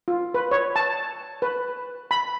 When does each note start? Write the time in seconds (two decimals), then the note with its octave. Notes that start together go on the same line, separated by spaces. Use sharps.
0.08 F4
0.34 B4
0.51 C#5
0.76 A5
1.42 B4
2.11 B5